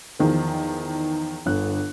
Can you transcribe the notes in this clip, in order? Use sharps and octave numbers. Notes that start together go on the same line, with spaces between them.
E2 D#3 F3
G1 D3 F#6